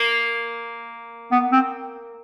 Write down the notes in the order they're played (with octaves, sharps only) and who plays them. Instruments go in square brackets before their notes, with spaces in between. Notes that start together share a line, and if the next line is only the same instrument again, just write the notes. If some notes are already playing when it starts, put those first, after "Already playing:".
Already playing: [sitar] A#3
[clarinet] B3
C4